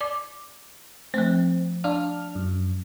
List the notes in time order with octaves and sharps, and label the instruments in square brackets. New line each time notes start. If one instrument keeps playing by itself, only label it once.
[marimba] D5 D6
[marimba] F3 A3 [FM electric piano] C4
[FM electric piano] D4 F6 [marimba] F5
[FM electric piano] F#2